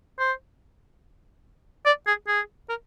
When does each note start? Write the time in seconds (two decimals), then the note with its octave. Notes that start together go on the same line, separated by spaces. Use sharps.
0.19 C5
1.85 D5
2.07 G#4
2.28 G#4
2.69 A#4